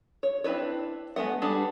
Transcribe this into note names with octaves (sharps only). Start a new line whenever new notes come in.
C#5
C4 D4 E4 B4 C#5
G#3 A3 B3 F#5
G3 D4 G#4 A4 B4